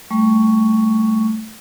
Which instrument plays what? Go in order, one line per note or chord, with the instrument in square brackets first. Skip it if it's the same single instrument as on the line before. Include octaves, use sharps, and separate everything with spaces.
[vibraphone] G3 A3 C#6